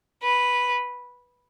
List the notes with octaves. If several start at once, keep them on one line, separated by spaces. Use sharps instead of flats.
B4